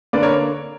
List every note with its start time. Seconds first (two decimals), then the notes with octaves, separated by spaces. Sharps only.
0.13 D3 A#3 B4 D5
0.23 A#4 C#5